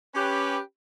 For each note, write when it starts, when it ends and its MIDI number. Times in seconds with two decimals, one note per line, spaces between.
0.15 0.59 61
0.15 0.59 67
0.15 0.59 71